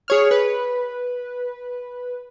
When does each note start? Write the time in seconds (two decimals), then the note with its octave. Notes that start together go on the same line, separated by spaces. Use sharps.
0.08 G#4 C#5 F6
0.31 B4